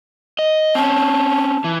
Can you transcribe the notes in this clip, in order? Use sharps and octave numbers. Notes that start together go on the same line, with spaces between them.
D#5
C4 C#4 A5
E3